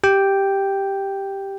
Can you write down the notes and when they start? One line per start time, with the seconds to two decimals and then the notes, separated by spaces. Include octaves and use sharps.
0.04 G4 G5